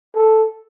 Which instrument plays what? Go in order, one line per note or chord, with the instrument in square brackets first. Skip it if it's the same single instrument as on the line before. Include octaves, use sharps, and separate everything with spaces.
[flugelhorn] A4